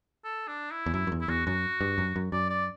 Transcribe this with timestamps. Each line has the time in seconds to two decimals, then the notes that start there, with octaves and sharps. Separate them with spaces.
0.24 A4
0.48 D4
0.71 E4
0.86 E2
0.94 F#2 E4
1.07 F#2
1.12 E2
1.21 E4
1.28 E2 F#4
1.46 F#2 F#4
1.81 G2
1.98 F#2
2.16 F#2
2.32 F#2 D5
2.50 D5